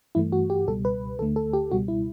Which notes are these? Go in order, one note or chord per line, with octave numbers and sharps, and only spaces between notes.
G2 E3 A3 E4
F#4
G4
C#2 B2 G3 A4
B4
D2 D3 A3 A4
A4
G4
C#2 B2 G3 F#4
E4